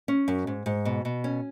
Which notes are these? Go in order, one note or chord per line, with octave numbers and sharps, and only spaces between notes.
C#4
F#2
G#2
G#2
B2
B2
C#4